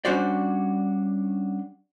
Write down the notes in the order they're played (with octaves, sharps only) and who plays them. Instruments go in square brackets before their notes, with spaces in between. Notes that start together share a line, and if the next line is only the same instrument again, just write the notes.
[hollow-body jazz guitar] G3 C#4 D4 F#4 C5 D5